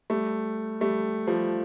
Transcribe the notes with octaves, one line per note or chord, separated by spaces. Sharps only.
G3 A3
G3 A3
F3 G3